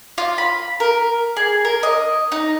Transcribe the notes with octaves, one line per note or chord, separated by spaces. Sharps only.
F4
B5
A#4
G#4
A#4
D#5
D#4